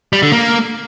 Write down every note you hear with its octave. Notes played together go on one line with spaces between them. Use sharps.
G3
D3
A#3